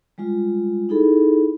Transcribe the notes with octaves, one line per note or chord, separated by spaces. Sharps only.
G3 G#3 F4
D#4 E4 G#4 A4 B5